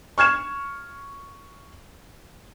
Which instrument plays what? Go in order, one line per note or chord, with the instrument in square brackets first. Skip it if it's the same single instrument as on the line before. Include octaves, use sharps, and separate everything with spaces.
[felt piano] C#6 F6 G#6 E7